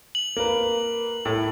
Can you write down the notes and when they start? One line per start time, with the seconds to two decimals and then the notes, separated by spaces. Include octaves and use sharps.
0.15 F#7
0.36 A#3 B4
1.25 A2